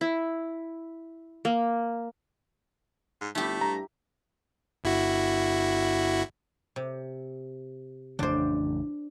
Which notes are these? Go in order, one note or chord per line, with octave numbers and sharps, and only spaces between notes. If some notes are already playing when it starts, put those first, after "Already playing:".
E4
A#3
G#2
G1 A3 E4 G4
G2 A#5
G1 E4 F#4
C3
A1 F2 C#3 D4 C5